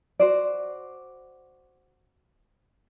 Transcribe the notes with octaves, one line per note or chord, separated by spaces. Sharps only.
F#4 C5 D5